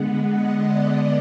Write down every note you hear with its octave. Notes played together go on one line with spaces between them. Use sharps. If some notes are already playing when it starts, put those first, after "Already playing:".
Already playing: D3 G#3 B3 F#5
D#5
D5